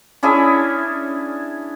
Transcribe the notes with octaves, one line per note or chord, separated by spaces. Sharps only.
C#4 D4 E4 G#4